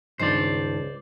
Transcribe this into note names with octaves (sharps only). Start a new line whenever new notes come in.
C#2 G2 D#3 C5 D5